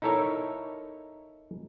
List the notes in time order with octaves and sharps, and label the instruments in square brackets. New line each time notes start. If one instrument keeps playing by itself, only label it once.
[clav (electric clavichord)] D#4 E4 A4 A#4 C#5 E5